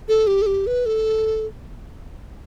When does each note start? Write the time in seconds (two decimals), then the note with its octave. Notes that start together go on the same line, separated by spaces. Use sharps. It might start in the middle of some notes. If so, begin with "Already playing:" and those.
0.08 A4
0.27 G4
0.42 A4
0.46 G4
0.67 B4
0.86 A4